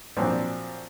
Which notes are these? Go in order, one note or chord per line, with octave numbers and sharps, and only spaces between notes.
A#2 F3 F#3 C4 D4